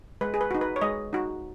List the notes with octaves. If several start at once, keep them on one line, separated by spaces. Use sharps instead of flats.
G#3 B4
G#4
B4
D#4 F#4
B4
C#5
G#3 D#5
D#4 F#4